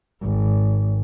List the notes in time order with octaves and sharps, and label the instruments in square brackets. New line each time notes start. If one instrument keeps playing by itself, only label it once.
[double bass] G#1